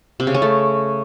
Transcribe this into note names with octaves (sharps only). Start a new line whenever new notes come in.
C3
C#3
C#4
A3